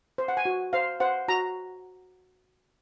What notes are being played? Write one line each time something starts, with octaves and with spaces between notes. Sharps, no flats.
C5
F#5
G#5
F#4
C5 F5
C5 F#5
F#4 A#5